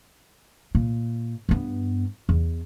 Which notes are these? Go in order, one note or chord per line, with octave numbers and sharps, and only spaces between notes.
A#2
G2 B3
E2